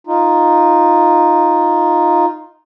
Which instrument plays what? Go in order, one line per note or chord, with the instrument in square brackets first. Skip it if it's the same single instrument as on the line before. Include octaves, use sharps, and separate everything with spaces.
[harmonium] D#4 F4